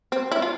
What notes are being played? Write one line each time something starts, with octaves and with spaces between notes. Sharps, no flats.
C4
E4
F4